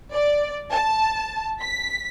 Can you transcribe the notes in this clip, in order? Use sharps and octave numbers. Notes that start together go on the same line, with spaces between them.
D5
A5
B6